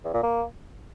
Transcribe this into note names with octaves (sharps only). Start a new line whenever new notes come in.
E2
A#2
A#3